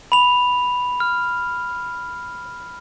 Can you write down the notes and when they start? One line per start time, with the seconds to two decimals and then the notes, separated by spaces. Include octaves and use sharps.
0.12 B5 F7
1.00 F6